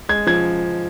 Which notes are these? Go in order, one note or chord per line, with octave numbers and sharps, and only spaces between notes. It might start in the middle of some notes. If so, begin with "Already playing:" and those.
G#3 G#6
F3 G#6